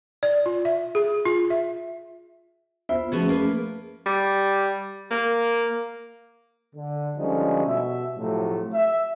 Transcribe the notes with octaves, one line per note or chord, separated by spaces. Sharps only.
D5
F4
E5
G#4
F4
E5
B3 F4 C5 E5
F3 A3 B3 C#4 F#4 G#4
A#3 B4
G3
A#3
D3
D3 F3 G3 G#3 C#4 D#4
B2 E5
A2 C3 F3 F#3 A3
E5